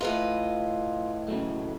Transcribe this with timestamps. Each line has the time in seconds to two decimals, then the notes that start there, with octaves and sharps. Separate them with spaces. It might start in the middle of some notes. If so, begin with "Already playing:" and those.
0.01 A2 F4 B4 D#5
1.28 C#3 F#3 A3